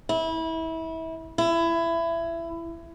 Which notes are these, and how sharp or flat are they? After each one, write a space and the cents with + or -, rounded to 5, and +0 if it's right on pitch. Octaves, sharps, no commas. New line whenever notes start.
E4 -25
E4 +20